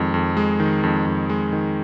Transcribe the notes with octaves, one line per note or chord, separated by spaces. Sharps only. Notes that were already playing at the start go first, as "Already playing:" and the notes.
Already playing: F2 D#3 G#3
F2
G#3
D#3
F2
F2
G#3
D#3